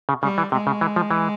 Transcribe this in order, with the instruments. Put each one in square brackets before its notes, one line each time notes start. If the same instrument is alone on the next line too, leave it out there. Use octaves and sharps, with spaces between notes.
[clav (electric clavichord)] C#3
[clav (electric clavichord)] C#3 [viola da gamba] G3
[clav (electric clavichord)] E3
[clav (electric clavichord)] C3 [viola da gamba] G#3
[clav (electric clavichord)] C#3
E3
F3
E3